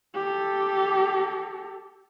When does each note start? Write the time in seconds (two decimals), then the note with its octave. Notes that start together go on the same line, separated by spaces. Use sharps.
0.15 G4 A4